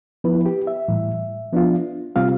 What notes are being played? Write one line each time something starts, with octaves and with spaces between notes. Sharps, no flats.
F3 B3 E4 B4
G4
E5
A2 E3 G3
F3 B3 D4 F4
C3 G3 C4 F4 F5